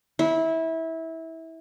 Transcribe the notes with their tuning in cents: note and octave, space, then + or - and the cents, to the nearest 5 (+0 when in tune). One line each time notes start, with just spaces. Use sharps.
E4 -20